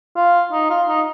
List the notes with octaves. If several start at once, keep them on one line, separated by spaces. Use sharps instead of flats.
F4
D#4
F4
D#4